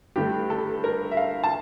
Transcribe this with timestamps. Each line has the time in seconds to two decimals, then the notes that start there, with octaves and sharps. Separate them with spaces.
0.16 G2 D3 A3 G4
0.50 A4
0.84 A#4
1.11 E5
1.17 F5
1.44 A5